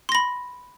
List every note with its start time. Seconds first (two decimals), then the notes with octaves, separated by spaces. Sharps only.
0.09 C6
0.12 A#6
0.15 B5